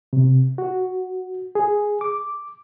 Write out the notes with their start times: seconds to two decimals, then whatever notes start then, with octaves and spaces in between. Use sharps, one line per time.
0.13 C3
0.58 F#4
1.55 G#4
2.01 D6